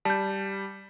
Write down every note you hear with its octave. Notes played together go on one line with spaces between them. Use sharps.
G3 A5 G6